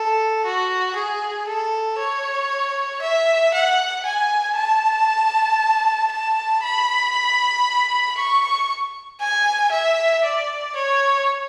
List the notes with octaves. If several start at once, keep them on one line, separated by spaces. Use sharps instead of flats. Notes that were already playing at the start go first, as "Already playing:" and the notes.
Already playing: A4
F#4
G#4
A4
C#5
E5
F#5
G#5
A5
A5
B5
C#6
G#5
E5
D5
C#5